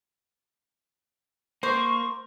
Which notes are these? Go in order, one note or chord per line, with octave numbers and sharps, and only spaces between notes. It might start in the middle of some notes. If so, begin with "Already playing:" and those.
A#3 C5 C#6